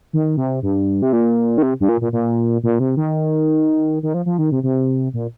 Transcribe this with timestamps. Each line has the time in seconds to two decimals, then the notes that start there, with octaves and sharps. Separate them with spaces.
0.13 D#3
0.37 C3
0.63 G2
1.02 C3
1.13 A#2
1.58 D#3
1.62 C3
1.80 G2
1.89 A#2
2.01 A#2
2.13 A#2
2.63 A#2
2.80 C3
2.97 D#3
4.03 D#3
4.14 F3
4.26 F3
4.38 D#3
4.52 C3
4.63 C3
5.14 A#2